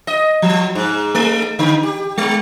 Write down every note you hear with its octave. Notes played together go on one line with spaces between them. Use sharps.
D#5
F3
G#2
A3
D3
G4
G#3